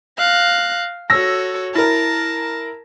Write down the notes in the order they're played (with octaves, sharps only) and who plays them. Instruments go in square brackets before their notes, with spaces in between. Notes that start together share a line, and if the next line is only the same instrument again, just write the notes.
[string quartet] F5 F#6 A#6
[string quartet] F#4 A4 C#5 [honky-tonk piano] E6 A#6
[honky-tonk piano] E4 A#4 [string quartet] A5 A#6